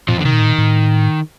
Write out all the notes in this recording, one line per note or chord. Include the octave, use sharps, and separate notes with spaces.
F2 A#2 F3
D3
C3 D#3
A#2
A2
A#2
A2